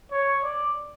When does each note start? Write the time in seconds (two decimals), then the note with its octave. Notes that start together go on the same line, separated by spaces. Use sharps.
0.11 C#5
0.43 D5